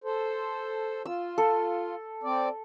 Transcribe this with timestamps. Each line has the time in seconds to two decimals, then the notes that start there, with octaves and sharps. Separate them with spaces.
0.04 A4 C5
1.06 F4 E6
1.38 A4
2.23 C4 D5